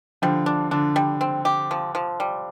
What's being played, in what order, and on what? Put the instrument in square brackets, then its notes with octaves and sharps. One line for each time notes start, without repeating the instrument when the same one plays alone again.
[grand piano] D3 F3 [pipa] G3
[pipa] D4
[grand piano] D3 [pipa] D4
[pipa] G3
C4
G4
F3
F3
G3